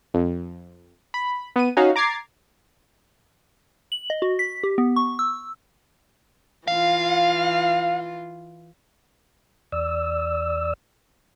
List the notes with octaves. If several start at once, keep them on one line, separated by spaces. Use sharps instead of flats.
F2
B5
B3 D#7
C#4 D#4 F#4 F5
A#5 D6 G#6 A6 C7
F#7
D#5
F#4
B6
G4
B3
C#6
E6
E3 F4 F5
E2 D5 E6